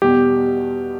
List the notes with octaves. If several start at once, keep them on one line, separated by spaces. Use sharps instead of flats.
E2 B2 G3 G4